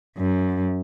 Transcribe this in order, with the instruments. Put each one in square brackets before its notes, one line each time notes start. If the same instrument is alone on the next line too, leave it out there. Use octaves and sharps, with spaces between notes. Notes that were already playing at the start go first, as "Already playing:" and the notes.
[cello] F#2